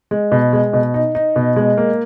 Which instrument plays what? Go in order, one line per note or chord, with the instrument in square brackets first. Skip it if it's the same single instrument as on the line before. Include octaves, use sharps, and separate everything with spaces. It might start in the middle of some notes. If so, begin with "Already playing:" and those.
[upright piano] G#3
B2
G#3
B2
D#4
D#4
B2
G#3
A#3